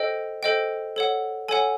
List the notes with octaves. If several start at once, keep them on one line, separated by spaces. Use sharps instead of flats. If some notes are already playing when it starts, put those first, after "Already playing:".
Already playing: A4 C5 D#5 G5
A4 C5 D#5 G5
A4 C#5 F#5
A4 C#5 F#5 G#5